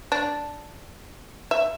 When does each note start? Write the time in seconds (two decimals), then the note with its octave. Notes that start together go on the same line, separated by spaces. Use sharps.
0.12 D4
1.51 E5